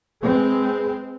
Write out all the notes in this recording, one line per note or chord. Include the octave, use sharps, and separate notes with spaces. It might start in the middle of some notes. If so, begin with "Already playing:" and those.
G#3 C4 G#4 B4